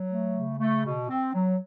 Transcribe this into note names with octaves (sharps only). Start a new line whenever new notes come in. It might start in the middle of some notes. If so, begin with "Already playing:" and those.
Already playing: F#3
A3
C#3
A3
B2
C4
F#3